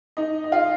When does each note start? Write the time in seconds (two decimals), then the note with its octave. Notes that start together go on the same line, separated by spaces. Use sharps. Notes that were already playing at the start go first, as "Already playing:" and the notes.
0.17 D#4 D#5
0.44 D#5
0.52 F4 F5